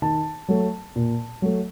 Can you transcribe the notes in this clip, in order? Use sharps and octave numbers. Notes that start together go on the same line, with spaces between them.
D#3 A5
F#3 A3
A#2
F#3 A3